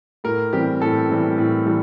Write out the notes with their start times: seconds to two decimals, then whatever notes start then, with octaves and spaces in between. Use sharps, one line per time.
0.24 A2 A#4
0.53 E3 G3 C4 G4
0.81 A2 A4
1.09 E3 G3 C4
1.38 A2
1.66 E3 G3